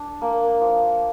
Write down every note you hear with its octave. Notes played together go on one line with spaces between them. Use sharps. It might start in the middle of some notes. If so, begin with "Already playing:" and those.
Already playing: D4
A#3
F3